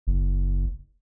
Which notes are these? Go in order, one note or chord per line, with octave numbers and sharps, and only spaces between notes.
F#1